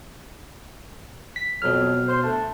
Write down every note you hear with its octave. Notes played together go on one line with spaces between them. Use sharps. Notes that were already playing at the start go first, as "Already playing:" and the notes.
B6
F2 B2 F#3 F6
C5
A3 D4